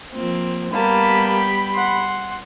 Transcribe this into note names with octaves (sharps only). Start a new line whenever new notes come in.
F3 A#3 C4
G3 A#3 B3 G4 A5 B5
F#5 C6